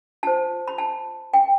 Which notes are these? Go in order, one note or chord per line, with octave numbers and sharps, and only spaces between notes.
F4 C5 A5
B5
A5
G5